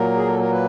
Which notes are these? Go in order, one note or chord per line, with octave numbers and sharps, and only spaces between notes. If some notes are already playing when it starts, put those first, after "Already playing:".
Already playing: A#2 F#3 A#3 A#4
G#4
A4
A#4
B4